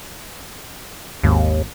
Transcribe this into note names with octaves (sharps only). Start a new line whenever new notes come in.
G#1 D#2